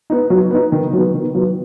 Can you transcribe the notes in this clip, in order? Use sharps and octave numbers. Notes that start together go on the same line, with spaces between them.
B3 D#4
F#3
B3 D#4
D#3
F#3 B3
D#3
F#3 B3